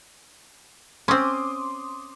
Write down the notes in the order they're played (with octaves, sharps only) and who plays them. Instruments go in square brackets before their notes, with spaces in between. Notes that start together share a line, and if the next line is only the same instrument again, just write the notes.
[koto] C4 C#4 [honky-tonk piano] C6 D6 D#6